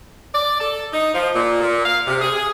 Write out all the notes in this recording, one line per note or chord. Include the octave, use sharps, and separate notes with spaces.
D5
A4
D#4
F3
A#2
A#2
F5
C3
G#4
G#4